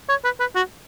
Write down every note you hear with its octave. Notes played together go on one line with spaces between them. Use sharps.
C#5
B4
B4
F#4